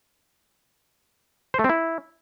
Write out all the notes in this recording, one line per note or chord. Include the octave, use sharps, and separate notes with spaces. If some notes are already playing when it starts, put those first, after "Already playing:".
C5
A3
C4
E4